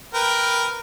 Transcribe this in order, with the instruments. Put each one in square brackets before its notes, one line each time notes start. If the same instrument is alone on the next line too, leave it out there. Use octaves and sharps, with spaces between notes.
[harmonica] A#4 B4 G5